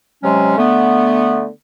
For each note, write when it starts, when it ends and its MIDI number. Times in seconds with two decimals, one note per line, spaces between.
0.23 0.54 48
0.23 0.54 54
0.23 0.54 56
0.23 0.54 61
0.58 1.49 50
0.58 1.49 57
0.58 1.49 59